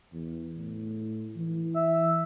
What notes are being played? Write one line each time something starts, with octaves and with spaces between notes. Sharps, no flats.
E2
A2
E3
E5